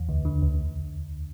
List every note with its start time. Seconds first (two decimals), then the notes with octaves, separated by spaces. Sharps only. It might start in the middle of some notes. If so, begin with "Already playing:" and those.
Already playing: E2
0.09 D2
0.25 D3
0.42 D2